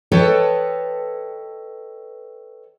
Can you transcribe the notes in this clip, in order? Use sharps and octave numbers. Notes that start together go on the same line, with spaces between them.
A4 B4 C#5 D#5 G5 A5